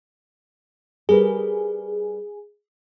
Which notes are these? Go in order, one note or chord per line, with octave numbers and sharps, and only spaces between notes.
G3 G#4 A#4 B4